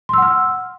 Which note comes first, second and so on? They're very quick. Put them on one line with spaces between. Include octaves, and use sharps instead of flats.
C6 E6 F#5 F6